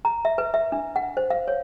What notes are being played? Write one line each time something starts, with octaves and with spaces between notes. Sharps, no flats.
A#5
E5
B4
E5
D4
F#5
C5
F5
C#5